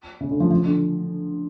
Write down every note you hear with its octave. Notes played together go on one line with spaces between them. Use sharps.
C#3
D3
F3
F3
D3